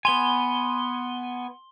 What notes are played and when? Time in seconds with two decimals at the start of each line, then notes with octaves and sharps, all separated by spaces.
0.05 B3 G#5 C6 G7